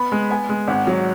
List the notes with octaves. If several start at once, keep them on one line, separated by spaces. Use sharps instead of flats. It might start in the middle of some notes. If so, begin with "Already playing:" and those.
Already playing: B3 B5
G#3
B3 G#5
G#3
G#1 F#5
F#3